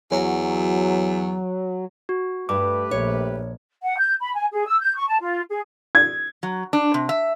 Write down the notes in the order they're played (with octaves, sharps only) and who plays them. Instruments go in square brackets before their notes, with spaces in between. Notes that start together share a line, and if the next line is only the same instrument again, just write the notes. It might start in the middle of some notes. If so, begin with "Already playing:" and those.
[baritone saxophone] E2 [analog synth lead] F#3
[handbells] F#4
[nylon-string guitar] G2 [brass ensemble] A3 G4 B4 [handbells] D6
[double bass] A#1 [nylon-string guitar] C#5
[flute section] F#5
G6
B5
G#5
G#4
E6
G6
C#6
A5
F4
G#4
[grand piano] G#6
[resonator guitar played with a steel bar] F#3
D4
C3
E5